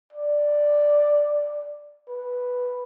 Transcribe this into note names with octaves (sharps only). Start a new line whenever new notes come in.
D5
B4